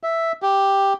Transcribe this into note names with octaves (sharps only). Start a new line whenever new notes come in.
E5
G4